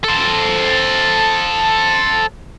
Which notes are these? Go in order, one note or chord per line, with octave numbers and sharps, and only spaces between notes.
A4 C5